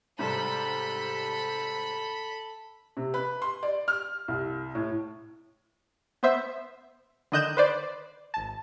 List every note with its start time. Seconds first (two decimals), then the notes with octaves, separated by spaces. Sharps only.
0.19 G#2 C3 G3 A4 B5
2.97 C3
3.14 B4
3.42 C6
3.63 D5
3.88 F6
4.28 C2
4.75 A2
6.23 B3 C5 E5
7.32 D3 D#3 D#5 F#6 G6 E7
7.57 B4 C5 D5
8.34 G#1 A5